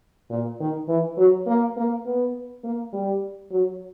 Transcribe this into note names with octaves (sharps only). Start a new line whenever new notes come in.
A#2
D#3
E3
F#3
A#3
A#3
B3
A#3
G3
F#3